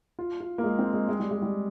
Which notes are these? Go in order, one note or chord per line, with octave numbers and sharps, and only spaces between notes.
F4
F4
A#3
G#3
C4
G#3
G#3
G3
G#3
G3